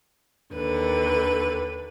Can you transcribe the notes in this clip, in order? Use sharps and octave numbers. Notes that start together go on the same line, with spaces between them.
D#2 D3 B4